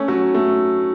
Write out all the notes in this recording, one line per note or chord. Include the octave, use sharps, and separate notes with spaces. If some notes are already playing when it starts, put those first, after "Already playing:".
Already playing: A3 C#4
F#3
A3